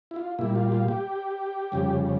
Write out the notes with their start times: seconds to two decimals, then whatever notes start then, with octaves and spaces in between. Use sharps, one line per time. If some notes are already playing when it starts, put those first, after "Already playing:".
0.11 E4
0.16 F4
0.39 A#2 G3 E4
0.55 F4
0.72 F4
0.88 G4
1.72 F2 C#3 G3